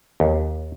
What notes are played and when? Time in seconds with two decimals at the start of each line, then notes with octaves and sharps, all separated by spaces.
0.20 D#2